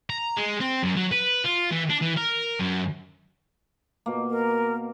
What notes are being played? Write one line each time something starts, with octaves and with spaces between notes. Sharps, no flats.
A#5
G#3
C4
F#2
F#3
B4
F4
E3
D4
E3
A#4
F#2
B2 A#3
A#4